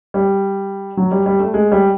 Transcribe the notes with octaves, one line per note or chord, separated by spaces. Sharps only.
G3
F#3
G3
G3
A3
G#3
G3